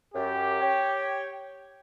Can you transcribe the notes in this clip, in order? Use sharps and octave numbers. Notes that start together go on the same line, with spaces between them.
F#2 G4
C#5 G5